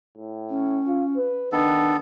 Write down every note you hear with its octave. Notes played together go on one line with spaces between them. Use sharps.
A2
C#4
F4
B4
D#3 B3 D4 A4